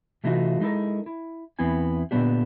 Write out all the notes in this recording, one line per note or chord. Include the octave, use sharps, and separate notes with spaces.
C3 E3 A3 D#4 F4 F#4
G#3 D#4 E4 A4 A#4
E4
E2 B3 C4 E4 G#5
A#2 D3 E3 B3 D4 G4